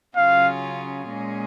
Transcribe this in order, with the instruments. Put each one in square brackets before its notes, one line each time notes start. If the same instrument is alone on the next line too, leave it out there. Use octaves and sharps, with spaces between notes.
[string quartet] C#3 F#3 C#4 F4 G#4 [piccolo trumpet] F5
[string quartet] A#2 G#3 C#4 G#4